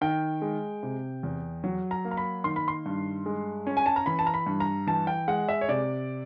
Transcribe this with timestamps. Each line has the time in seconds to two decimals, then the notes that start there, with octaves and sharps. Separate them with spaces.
0.01 D#3 G5
0.42 G#3
0.83 C3
1.23 E2
1.64 F#3
1.91 A#5
2.05 A#3
2.11 A#5
2.17 B5
2.44 D#3 C6
2.56 B5
2.68 C6
2.86 G2
3.26 G#3
3.67 C#4
3.77 G#5
3.86 A5
3.96 A#5
4.06 E3 B5
4.19 A5
4.27 A#5
4.34 B5
4.46 G2
4.60 A#5
4.87 E3 A5
5.07 G5
5.28 G#3 F#5
5.49 E5
5.61 C#5
5.68 C3 D5